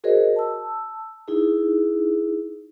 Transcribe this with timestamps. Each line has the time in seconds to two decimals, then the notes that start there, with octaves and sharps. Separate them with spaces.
0.04 F#4 G#4 A#4 C5 C#5 D#5
0.36 A5 E6
1.28 D#4 E4 G#4